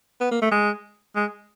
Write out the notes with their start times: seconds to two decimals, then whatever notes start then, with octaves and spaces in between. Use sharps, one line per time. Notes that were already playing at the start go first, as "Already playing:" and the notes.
0.21 B3
0.31 A#3
0.42 A3
0.51 G#3
1.15 G#3